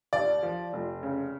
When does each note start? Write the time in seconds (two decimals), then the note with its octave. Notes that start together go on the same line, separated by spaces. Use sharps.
0.13 D#2 D5
0.43 F3
0.73 F1
1.03 C#3